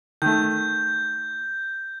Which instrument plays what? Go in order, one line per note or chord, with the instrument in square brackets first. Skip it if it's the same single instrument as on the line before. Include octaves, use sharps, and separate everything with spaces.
[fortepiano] D#3 A3 [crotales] G6